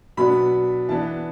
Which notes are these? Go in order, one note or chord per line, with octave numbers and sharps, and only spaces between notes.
B2 F#3 B3 D4 B5
E3 B3 D4 A5